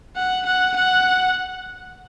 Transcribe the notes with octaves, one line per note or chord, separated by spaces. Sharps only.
F#5
F#5
F#5